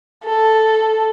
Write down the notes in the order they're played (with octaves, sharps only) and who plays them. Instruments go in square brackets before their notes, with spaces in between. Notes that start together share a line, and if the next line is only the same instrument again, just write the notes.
[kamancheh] A4